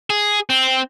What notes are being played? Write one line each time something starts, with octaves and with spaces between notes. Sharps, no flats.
G#4
C4